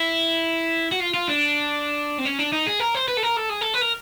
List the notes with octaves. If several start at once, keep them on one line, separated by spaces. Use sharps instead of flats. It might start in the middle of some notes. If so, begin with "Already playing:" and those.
Already playing: E4
F#4
F4
F4
D4
C4
C#4
D4
D#4
G#4
A#4
C5
B4
A4
A#4
A4
G#4
A4
B4
A#4